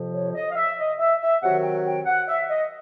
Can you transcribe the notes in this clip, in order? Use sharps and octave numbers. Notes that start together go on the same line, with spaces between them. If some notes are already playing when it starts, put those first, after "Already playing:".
Already playing: F2 C3 F3
C#5
D#5
F5
E5
D#5
E5
E5
C3 D#3 F#3 F#5
G5
G5
F#5
E5
D#5